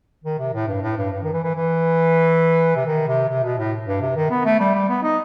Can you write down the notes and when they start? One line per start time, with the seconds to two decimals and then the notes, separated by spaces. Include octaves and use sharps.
0.24 D#3
0.39 C3
0.53 A2
0.67 G2
0.82 A2
0.97 G2
1.12 G2
1.22 D#3
1.33 E3
1.43 E3
1.55 E3
2.76 C3
2.85 D#3
3.07 C3
3.29 C3
3.43 B2
3.58 A2
3.86 G2
4.01 C3
4.16 D#3
4.30 B3
4.45 A3
4.59 G3
4.74 G3
4.88 B3
5.03 D#4